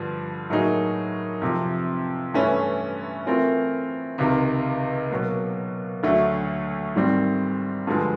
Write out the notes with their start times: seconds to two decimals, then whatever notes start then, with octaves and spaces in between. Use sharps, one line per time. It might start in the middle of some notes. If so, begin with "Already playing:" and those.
Already playing: G2 D3 F3
0.50 A2 F#3 A#3 D#4 G#4
1.42 F2 C3 F3
2.34 G2 E3 A3 C#4 E4
3.26 E3 A3 C4 F4 A#4
4.18 C#2 C3 D#3
5.10 B2 F#3 A#3
6.03 D2 D3 F#3 A3
6.95 G#2 D#3 G3 C4
7.87 G2 D3 F3 G#3